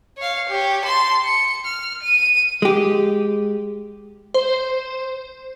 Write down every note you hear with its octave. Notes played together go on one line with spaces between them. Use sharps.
C#5 F5
G4 C#5
A5 C6
C#7
F6
D#7
G#3 G4
C5